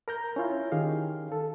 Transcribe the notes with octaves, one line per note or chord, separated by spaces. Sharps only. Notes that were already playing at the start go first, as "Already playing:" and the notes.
A#4 A#5 G6
C#4 E4 F4
D#3 G4 G#4 F5
A4